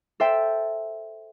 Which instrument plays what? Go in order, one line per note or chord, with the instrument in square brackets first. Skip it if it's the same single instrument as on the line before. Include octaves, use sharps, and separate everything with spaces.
[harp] A4 C5 E5 G5